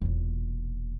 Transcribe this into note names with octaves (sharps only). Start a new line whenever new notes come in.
E1 A#2